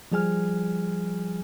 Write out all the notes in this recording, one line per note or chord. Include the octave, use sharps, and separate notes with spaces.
F3 G3 G#4 G#5 F6